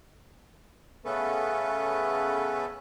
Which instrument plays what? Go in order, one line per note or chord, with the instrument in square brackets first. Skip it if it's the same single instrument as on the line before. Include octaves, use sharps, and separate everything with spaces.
[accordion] C#3 A3 B3 C#4 A4 B4